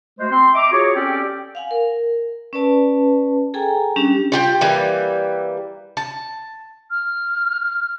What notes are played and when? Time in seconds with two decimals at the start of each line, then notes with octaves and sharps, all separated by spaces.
0.20 G#3 A3 F#4 C5
0.31 C4 C6
0.54 D#5 E5 A#5 D6
0.72 F4 F#4 G#4 C#5
0.95 C4 C#4 G4 A4 D5 G5
1.55 F5 F#5 G#5
1.71 A#4
2.53 C#4 B4 D5 A5
3.54 G#4 A4 G5 G#5 A#5
3.96 G3 C#4 D4 G4
4.32 F4 G4 G5
4.61 E3 G3 A#3
5.97 A5
6.91 F6